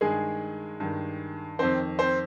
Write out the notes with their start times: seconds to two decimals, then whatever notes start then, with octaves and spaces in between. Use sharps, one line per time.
0.01 G2 D#3 G#3 G#4
0.80 G2 D#3
1.59 F2 D#3 C4 C5
1.99 C4 C5